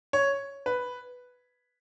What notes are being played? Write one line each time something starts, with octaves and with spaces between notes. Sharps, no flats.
C#5
B4